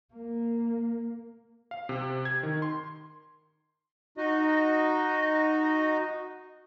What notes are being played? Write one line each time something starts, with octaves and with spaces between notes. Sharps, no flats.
A#3
F5
C3
G#6
D#3
C6
D#4 F#4 D#5